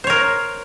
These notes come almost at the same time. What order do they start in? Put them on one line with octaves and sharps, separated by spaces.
C5 C#5 A#4